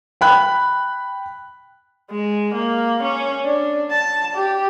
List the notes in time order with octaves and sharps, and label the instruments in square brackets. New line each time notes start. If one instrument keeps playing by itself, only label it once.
[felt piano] G5 B5 F#6
[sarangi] G#3
A#3
C#4
D4
A5
G4